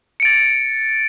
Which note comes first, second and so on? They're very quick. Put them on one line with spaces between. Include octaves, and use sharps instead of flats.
C#7 D7 A6